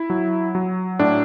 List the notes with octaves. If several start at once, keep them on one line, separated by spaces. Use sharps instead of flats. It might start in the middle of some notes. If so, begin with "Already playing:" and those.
Already playing: E4
F#3
F#3
A2 D4